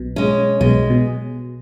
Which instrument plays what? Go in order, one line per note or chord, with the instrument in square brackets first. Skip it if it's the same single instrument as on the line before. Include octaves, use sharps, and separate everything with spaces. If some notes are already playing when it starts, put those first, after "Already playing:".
Already playing: [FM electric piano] B1 B2
[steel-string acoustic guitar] G#3 C#4
[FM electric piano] B1 B2 [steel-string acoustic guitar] G#3
[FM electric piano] B2